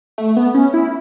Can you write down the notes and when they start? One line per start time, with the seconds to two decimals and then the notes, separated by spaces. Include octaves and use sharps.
0.18 A3
0.37 B3
0.54 C#4
0.74 E4